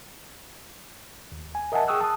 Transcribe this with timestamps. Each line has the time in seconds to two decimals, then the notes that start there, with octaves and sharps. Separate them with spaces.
1.32 D#2
1.55 G#5
1.72 A#4 D#5 E5 F#5 G#5 A5
1.88 G#4 G5 C#6 D#6 E6 F#6
2.01 A5 D#6